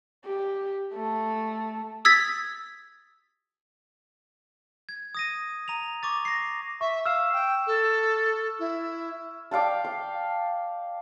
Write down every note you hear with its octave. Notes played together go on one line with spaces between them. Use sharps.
G4
A3
D#6 E6 G#6 A6 B6
G#6
D#6 A#6 D#7
A#5 D#7 F7
C#6 D6 A6
A#6 C7
E5 C#6
F5 E6 F6 E7
G5
A4
E4
D5 F5 G5 A5
F5